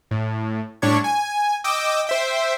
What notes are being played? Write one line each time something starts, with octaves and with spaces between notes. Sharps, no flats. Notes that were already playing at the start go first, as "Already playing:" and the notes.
A2
A2 G3 D4 C#5 C#6 G#6
G#5
D#5 G5 D6 E6
C5 E5 G5